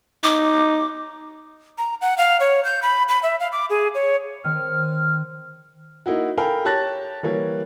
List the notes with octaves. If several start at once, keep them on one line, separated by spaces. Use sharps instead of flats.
D#4 D6
A#5
F#5
F5
C#5
G6
B5
B5
E5
F5
D6
G#4
C#5
D#3 C4 F6
A#3 D#4 E4 F#4
A4 A#4 F5 G5 G#5 B5
G4 C#5 A5 F#6 A6 A#6
E3 G3 A#3 C#5